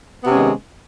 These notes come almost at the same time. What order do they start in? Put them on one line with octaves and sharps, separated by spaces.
B3 C3 C#4 G#3 D#3